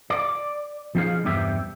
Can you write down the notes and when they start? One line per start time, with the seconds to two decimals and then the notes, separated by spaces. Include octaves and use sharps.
0.10 D5
0.95 F3 C4 D#4 G#4 F5
1.24 E2 G2 C3 G4 E5